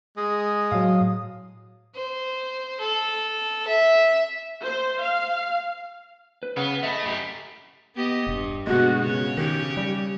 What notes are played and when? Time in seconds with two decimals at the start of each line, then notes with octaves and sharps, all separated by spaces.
0.17 G#3 D#6
0.72 A2 F#3 F5
1.95 C5
2.80 A4
3.67 E5
4.63 C5
5.00 F5
6.43 B4
6.57 C#3 B3
6.83 A3 D#5 E5 B5
7.06 F#2 G3
7.95 B3 G4 D#5
8.27 E1 G2
8.67 B2 D3 G#3 F#4
9.04 C#3 C#5
9.38 D#3 G4
9.77 G3